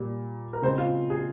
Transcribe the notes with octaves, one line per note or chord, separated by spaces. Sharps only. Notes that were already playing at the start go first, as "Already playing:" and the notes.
Already playing: A#2 G3 A#3
A#4
C#3 G#3 C4 C5
F4
G#4